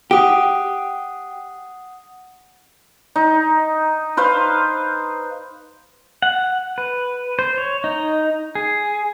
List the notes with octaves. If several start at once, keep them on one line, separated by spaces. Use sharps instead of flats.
G4 F#5 D#6
D#4
B4 C5 F5
F#5
B4
C5
C#5
D#4
G#4